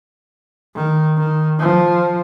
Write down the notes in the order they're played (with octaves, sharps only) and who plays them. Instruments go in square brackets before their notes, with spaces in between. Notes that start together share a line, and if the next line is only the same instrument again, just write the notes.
[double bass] D#3
D#3
F3